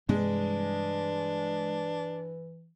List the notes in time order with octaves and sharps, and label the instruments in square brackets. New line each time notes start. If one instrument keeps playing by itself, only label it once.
[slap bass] G2 C3 G3 [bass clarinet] E3 [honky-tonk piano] G#3 [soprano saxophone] D4